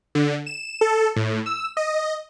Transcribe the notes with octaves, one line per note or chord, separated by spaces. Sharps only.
D3
E7
A4
A2
E6
D#5